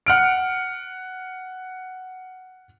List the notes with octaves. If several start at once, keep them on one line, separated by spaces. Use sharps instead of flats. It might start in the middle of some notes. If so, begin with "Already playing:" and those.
F#5 F6 D7